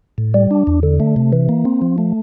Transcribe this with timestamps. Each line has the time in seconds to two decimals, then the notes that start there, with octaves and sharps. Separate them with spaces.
0.18 A2
0.34 G3
0.51 D4
0.67 E2
0.83 D3
1.00 A3
1.16 C3
1.33 E3
1.49 A#3
1.65 C4
1.82 F3
1.98 A3